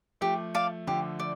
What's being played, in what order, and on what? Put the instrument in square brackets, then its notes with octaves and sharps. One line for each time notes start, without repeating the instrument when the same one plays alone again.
[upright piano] F3 A3 [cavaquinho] G4
[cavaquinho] D5 F5 A5
[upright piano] D3 F3 [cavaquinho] G4
[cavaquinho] D5